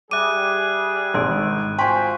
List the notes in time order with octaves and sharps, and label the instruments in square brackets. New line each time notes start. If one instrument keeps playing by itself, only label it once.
[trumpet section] G3 G#4 [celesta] E5 D6 [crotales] F#6 D#7
[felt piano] G#1 [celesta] C6 E6 D7
[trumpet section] F4 F#4 C5 [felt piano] G5 G#5 [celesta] C6 C#6 B6